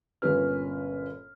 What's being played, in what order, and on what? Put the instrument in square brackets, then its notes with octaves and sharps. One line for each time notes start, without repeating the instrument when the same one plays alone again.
[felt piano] G1 A#2 C#4 B4 F6